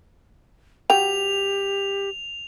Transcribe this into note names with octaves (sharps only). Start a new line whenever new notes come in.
F#3 G4 G5 F7